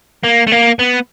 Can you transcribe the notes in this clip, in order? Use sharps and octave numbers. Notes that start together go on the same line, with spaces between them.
A#3
A3
A#3
B3